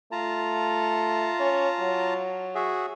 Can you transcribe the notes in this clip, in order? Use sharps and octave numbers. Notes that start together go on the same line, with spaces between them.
A3 F4 A5 A#5
C#4
F#3
F#4 G#4 E5